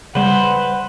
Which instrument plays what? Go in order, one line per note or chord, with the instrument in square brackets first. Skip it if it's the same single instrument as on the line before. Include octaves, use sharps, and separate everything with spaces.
[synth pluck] C#3 G3 [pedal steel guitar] B4 C5 [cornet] F#5